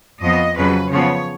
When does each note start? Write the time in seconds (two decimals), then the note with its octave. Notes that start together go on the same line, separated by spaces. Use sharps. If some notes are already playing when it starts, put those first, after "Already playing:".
0.21 F2 F3 B3 D#5
0.56 F2 C#3 F#3 B4
0.91 C#3 F3 B3 C#5